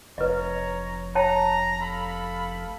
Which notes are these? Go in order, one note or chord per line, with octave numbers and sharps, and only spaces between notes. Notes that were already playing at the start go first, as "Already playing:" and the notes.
F1 B4 C#5 D#5 A#5
C#5 G5 A5 A#5
A4 F5 B5